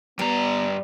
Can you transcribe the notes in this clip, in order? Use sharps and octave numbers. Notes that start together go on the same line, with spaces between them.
G2 G3 B3 A#5